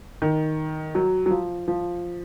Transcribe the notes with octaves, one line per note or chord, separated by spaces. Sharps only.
D#3
F#3
F#3
F3
F3